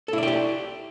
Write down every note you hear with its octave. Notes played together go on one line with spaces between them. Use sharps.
E4 G4 A4 D5 G5